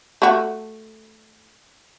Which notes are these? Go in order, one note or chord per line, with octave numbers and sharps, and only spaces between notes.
A3 F#4